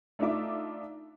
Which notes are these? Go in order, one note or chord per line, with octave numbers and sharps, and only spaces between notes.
A3 D4 D#4 F4 E5 D6